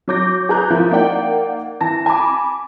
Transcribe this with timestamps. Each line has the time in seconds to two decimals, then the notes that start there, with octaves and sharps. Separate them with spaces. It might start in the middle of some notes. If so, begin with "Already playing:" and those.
0.08 F#3 C#5 D6 G6 A#6
0.49 G#4 B4 A#5 F#6 G6
0.70 F3 E4 A#4
0.91 A#3 D#4 D5 F#5 G5
1.81 E3 A5 A#6
2.06 G#5 A5 B5 D6